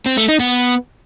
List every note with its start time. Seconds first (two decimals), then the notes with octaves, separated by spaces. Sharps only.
0.06 C4
0.17 A3
0.28 D#4
0.40 B3